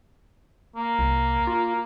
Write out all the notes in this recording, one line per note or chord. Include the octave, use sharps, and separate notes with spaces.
A#3
C2
F4